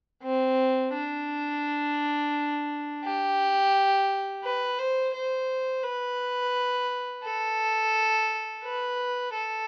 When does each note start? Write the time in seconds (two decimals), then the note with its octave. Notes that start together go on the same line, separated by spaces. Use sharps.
0.23 C4
0.93 D4
3.04 G4
4.44 B4
4.79 C5
5.14 C5
5.84 B4
7.24 A4
8.64 B4
9.34 A4